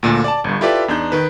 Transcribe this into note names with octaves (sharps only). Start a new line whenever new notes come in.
D2 A#2 D3
D5 A5
G1 G2
E4 F4 G4 A4 B4 D5
E2 D4 D#4 G6
D#3 B4